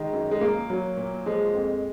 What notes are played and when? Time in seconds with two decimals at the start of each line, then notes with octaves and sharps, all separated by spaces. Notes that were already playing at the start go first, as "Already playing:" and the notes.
Already playing: D#3 G#3
0.13 F#2
0.31 G#3
0.41 A#2 A#3
0.70 F#3
0.97 A#2
1.26 F3 G#3
1.54 F2